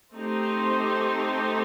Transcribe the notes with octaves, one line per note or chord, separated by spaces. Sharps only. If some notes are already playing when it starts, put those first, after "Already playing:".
A3 C4 D#4 G4 C5